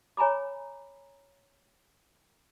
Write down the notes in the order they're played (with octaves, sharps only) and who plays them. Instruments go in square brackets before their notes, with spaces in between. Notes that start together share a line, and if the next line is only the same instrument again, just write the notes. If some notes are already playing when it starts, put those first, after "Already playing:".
[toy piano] C#5 G#5 A#5 B5 D6